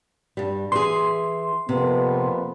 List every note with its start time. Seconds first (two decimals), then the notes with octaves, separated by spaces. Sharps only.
0.37 G2 G3
0.72 E3 G#4 C6
1.69 F2 C3 A#3 B3